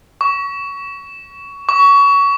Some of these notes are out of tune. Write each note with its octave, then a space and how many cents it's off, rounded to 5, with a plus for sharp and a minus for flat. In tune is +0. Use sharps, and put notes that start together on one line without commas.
C#6 +20
C#6 +25